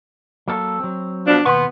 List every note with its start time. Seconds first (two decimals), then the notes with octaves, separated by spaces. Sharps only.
0.48 F#3 A#3 A4
0.80 F#3 C4
1.27 B2 F3 D4
1.45 D#2 B2 B3 C6